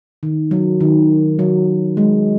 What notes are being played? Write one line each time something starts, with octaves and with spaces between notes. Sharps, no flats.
D#3
F#3
D#3
F#3
G#3